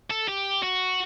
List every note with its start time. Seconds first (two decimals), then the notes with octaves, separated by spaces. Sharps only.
0.10 A4
0.28 G4
0.62 F#4